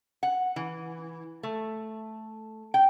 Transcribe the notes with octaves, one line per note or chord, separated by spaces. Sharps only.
F#5
E3
A3
G5